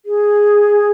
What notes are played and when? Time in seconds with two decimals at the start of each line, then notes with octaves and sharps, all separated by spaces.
0.06 G#4